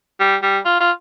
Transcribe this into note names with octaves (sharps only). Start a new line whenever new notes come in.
G3
G3
F4
F4